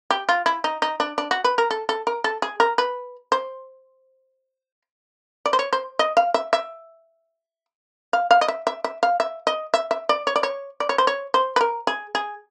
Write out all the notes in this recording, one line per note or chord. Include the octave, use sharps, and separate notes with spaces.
G4
F4
E4
D#4
D#4
D4
D4
F#4
B4
A#4
A4
A4
A#4
A4
G#4
A#4
B4
C5
D5
C5
C#5
C5
D#5
F5
E5
E5
F5
F5
D#5
E5
E5
E5
F5
E5
D#5
E5
E5
D5
C#5
D5
C#5
D5
C#5
C5
C#5
C5
B4
A#4
G#4
G#4